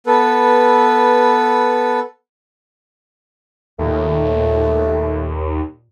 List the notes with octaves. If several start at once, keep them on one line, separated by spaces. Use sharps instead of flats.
B3 A4 B4
D#2 A#2 A3